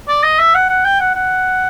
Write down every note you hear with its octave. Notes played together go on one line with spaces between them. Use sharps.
D5
D#5
E5
F#5
F#5
G5
F#5
F#5